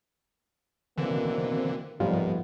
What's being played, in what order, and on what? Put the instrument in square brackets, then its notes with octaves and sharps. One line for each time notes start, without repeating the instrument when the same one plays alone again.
[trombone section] B2 A#3 C4 [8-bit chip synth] D3 E3
[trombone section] D#2 A3 B3 [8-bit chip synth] G#2 [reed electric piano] F3 G3 F4